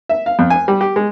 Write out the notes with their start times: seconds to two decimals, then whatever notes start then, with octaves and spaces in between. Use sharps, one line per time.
0.09 E5
0.26 F5
0.39 F2
0.50 G#5
0.68 G3
0.81 G4
0.96 G#3